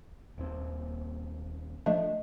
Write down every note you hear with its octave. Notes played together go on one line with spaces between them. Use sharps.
D#1 D#2 C4
F3 A3 D4 D#5